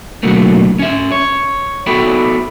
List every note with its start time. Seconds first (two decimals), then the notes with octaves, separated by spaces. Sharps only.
0.23 B2 D3 F#3 A3 A#3
0.79 C#4 E5
1.12 C#5
1.86 B3 F#4 A4 E5 G5 B5